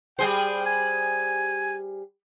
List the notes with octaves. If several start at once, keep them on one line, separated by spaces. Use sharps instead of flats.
G3 G#4 C5 G5
G#5